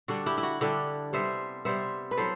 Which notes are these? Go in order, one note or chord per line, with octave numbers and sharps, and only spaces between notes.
D3 G3 D4 F#4
E4 G4
E4
F#4
D3 G3 D4 E4 G4
C3 G3 B3 C5 E5
C3 G3 B3 C5 E5
B4
F#3 B3 E4 A4 C5